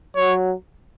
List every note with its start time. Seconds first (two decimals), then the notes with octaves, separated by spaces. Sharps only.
0.16 F#3 C#5